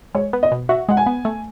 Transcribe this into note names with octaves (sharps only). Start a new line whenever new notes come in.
G#3 C#5
B3
D#5
B2
F#4 E5
G#3 F#5
G#5
B3
A3